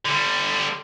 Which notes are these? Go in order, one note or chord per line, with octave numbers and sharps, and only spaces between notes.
D3 G3